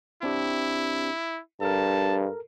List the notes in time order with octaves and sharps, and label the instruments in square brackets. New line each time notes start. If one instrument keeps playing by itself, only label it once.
[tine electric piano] C4 D4 G4 [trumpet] E4
[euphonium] G2 [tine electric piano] A4 A#4 [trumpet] A5